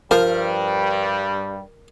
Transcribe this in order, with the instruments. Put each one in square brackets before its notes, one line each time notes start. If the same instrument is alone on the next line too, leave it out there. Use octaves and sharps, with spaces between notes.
[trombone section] G2 G3 [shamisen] F3 [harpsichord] A#4